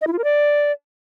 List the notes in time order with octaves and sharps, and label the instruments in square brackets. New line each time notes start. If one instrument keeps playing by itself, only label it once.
[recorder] D#5
E4
F4
A#4
D5